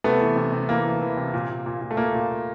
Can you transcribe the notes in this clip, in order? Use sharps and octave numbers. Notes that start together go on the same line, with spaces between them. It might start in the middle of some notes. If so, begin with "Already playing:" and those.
C3 A3 B3
E3
C3
C3
E3 A#3
E3
E3
C3
A#2
A#2
A#2
A#2
A3
A#2 A#3
A#2
A#2